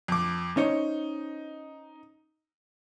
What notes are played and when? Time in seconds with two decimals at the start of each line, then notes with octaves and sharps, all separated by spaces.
0.08 F2 D6
0.57 C#4 D#4 C5 C#5